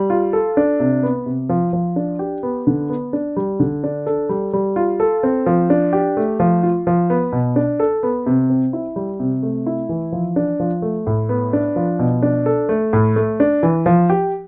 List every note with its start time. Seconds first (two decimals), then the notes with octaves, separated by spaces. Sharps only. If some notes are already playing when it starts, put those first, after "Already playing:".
Already playing: G3
0.10 F4
0.33 A4
0.57 D4
0.80 C3
1.03 B3
1.26 C3
1.49 F3
1.73 F3
1.96 D4
2.19 G4
2.43 B3
2.67 D3
2.89 B3
3.13 D4
3.36 G3
3.60 D3
3.84 D4
4.06 A4
4.29 G3
4.53 G3
4.76 F4
5.00 A4
5.23 C4
5.46 F3
5.70 D4
5.93 G4
6.17 A3
6.40 F3
6.63 F4
6.87 F3
7.10 B3
7.32 B2
7.56 D4
7.80 A4
8.03 B3
8.26 C3
8.50 C4
8.73 E4
8.96 G3
9.20 C3
9.43 A3
9.66 E4
9.89 E3
10.12 F3
10.36 D4
10.60 F3
10.82 A3
11.07 A2
11.29 B3
11.53 D4
11.76 F3
11.99 B2
12.22 D4
12.46 A4
12.69 A3
12.93 A2
13.16 A3
13.40 D4
13.63 E3
13.86 F3
14.10 G4